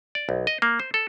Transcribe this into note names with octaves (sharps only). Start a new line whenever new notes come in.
D5
B1
D#5
A#3
C5
A4